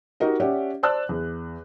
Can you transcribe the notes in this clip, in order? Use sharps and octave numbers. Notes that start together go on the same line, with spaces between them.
D#4 F#4 G4 A#4 D#5
C#4 G4 D5 E5 F#5
C5 D5 A5 E6 F#6
E2